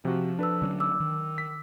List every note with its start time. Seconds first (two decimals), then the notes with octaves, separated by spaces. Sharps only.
0.05 C3 F3 F#4
0.39 D4 A4 B4 E6
0.62 D3 F#3 C#4 D4
0.80 D6 E6
1.00 D#3
1.38 B6